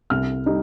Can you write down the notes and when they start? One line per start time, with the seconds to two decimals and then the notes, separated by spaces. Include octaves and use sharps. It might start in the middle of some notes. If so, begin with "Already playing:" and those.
0.10 C2 F6
0.46 G3 D#4